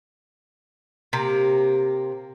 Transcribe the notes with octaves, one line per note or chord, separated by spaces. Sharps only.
C3 A#3